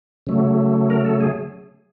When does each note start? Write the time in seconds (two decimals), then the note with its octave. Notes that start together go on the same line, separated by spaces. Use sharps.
0.27 C#3 F#3 A3
0.90 A#4
1.05 A4
1.20 G#4